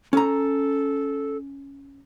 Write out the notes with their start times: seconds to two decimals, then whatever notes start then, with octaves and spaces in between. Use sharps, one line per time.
0.13 C#4 A4 A#5